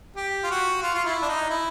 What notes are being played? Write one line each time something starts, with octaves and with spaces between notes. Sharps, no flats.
G4
F4
F#4
F4
F4
E4
D4
D#4
E4